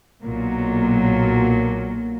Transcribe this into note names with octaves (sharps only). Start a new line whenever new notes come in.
B1 A#2 F#3 A#3